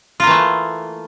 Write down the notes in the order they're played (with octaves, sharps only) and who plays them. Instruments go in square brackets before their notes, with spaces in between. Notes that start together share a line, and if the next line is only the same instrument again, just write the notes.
[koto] F4
A#3
E3
A3